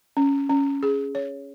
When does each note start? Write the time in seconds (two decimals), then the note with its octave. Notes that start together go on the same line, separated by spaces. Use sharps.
0.17 C#4
0.50 C#4
0.83 G#4
1.15 C#5